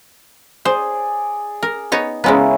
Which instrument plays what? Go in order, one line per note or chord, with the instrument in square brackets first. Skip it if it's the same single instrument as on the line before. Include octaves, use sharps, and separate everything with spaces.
[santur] G#4 D5 [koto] C5
[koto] A#4
B3 D#4 C#5
[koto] C#3 G#3 B3 [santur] A#3 C#4 E4